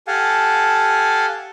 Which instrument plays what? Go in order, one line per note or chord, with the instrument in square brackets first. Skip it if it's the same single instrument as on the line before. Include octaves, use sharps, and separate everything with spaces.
[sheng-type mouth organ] G4 A4 F5 F#5 G#5 A5